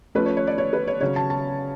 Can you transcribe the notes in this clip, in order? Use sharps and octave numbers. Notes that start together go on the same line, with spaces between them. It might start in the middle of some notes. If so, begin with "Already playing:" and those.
F3 A3 C#4 B4
C#5
C#5
D5
C#5
B4
C#5
C#3 F#3 C#4 C#5
A5
A5